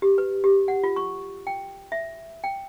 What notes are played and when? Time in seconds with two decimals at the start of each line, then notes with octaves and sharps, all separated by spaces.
0.02 G4
0.18 B4
0.44 G4
0.68 F#5
0.84 F4
0.96 C#6
1.47 G5
1.92 E5
2.44 G5